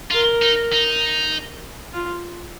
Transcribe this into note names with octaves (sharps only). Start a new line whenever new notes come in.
F4 A#4
D#4
D#4
F4